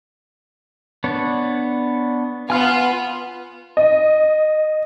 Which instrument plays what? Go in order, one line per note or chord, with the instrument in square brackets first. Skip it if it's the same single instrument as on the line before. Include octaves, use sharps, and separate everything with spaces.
[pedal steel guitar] B3 D4 C#5
[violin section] B3 F4 [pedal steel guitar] G#5 F6
[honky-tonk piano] D#5